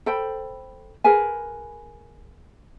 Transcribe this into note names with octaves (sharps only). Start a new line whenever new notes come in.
A4 C5 G5 B5
G#4 A#4 B4 G#5